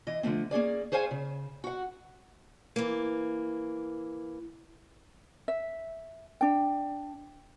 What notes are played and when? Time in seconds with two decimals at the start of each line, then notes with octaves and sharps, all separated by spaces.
0.07 E3 D#5
0.23 D3 F3 A3 C4
0.51 A#3 C#4 G#4 D5
0.92 G#4 C5 C#5 F5 G#5
1.11 C#3
1.64 F#4 F#5
2.76 E3 A#3
5.48 E5
6.41 D4 G5